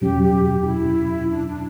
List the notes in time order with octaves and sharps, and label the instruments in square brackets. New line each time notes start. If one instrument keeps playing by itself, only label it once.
[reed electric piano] E2 B2 F#3 C#4 [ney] G4
[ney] G4
G4
D4
E4
D4
D4